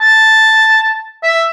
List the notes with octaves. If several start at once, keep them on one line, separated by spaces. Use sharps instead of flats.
A5
E5